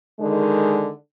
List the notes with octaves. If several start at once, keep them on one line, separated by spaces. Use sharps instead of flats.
D3 D#3 G#3